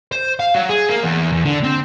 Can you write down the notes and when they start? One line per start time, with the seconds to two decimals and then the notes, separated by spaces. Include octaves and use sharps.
0.12 C5
0.40 F5
0.55 F#3
0.69 G#4
0.89 A#3
1.03 E2
1.32 E2
1.45 D3
1.64 C4